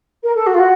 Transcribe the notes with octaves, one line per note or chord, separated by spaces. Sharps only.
A#4
A4
F#4
F4
F#4